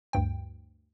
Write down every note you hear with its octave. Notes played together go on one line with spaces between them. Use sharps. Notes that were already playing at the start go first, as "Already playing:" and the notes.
D2 G2 G5